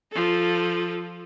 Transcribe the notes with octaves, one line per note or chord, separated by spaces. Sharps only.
F3 A4